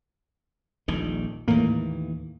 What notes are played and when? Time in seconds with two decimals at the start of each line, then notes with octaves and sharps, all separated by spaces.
0.88 D#1 A#1 D#3
1.48 D#2 A2 E3 A#3